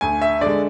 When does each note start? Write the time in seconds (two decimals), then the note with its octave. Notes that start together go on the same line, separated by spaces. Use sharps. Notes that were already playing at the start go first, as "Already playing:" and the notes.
0.01 D2 G#5
0.22 E5
0.41 D3 G#3 D5